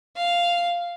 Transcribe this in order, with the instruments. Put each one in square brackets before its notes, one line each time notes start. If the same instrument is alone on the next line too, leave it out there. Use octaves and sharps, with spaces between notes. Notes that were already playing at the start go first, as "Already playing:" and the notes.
[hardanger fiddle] F5